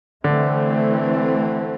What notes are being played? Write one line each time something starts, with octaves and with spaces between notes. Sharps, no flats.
D3 E3 A3 C4